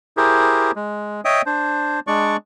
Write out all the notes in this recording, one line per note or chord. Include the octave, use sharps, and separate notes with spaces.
E4 G4 G#4 A#4 C5
G#3
C#5 D#5 E5 G5 D#6
D4 C5
G#3 D4 D5 C#6